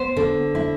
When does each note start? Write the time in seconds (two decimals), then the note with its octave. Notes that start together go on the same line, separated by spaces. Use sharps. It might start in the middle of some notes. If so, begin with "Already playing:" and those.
Already playing: B3 C5
0.17 D3
0.55 E4